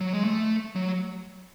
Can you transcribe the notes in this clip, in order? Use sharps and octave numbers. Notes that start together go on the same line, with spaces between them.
F#3
G#3
A3
F#3